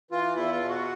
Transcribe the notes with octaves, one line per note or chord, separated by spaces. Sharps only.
E3 F4
E2 E4
F4
B2
F#4